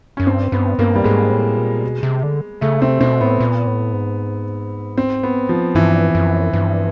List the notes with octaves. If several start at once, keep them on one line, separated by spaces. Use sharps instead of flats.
F#2 C#4
G2 C4
G2 B3
G2 A#3
G3
G#2 G#3
A2
A#2
B2
C3
D3
C#3 A3
C3 C4
B2 C4
A2 B3
A#2
A2
G#2
C4
B3
F3
G2 E3
F#2
G2